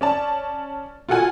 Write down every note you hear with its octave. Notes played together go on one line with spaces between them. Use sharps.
C#4 D5 A5
F4 F#4 A4 F#5 G#5